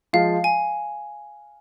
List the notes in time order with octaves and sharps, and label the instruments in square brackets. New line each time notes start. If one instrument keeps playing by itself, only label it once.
[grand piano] F3 G#3 F4 [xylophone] F5
[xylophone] G#5